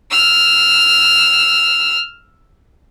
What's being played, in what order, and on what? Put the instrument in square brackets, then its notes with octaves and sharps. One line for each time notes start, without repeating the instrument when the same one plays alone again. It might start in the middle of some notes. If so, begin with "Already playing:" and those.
[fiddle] E6 F6